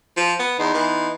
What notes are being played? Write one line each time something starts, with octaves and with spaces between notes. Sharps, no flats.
F3
B3
E2 B3 D#4 C6
E3